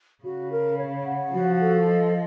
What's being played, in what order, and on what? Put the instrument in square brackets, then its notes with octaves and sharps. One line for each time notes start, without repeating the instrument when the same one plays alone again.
[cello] C#3 [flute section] F#4
[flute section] A#4
C#5
F#5
[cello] F3 [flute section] F#4
[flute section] A4
D#5